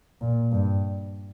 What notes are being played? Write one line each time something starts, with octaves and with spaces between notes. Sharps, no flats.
A#2
G2